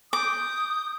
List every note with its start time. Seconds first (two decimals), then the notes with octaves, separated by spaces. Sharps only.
0.13 D6 D#6 G6